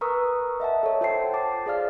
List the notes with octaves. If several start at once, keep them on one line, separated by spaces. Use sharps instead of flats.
A#4 B4 A#5 C#6 D#6 E6
D#5 E5 F#5 A5
A4 C#5
F4 C5 C#5 G5 A5 C7
A5 D6 A6
G#4 C5 D5 F5 F6